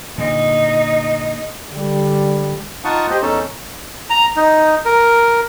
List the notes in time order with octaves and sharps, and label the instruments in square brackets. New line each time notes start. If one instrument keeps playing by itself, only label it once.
[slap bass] A#2 D3 [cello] D#4
[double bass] D3 G3
[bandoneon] D#4 F4 F#5 A5 C#6 D#6
G4 C5 D#5
E2 C#4 D#4 A4 C#5 A5
[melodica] A#5
D#4
A#4